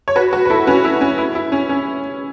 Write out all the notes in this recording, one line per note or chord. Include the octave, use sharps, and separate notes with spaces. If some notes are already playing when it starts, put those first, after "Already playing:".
C#5
F#4 B4
F#4 B4
B4
E4 A4
C#4 F#4
E4
C#4
E4
E4
C#4
C#4